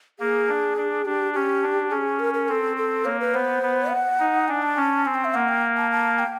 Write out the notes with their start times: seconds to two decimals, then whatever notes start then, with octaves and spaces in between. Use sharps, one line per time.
0.19 A#3 G#4
0.48 D4
0.77 D4
1.05 D4 G4
1.34 C#4 G4
1.63 D4
1.91 C#4 G#4
2.20 A#4
2.34 A#4
2.48 C4 A4
2.77 A4
3.05 A#3 C#5
3.20 B4
3.34 B3 C5
3.62 B3
3.91 F#5
4.19 D#4
4.48 D4 G#5
4.62 A5
4.76 C#4
5.05 C4 G#5
5.14 G5
5.25 E5
5.34 A#3 F#5
5.49 G5
5.77 A5
5.92 A5
6.19 G5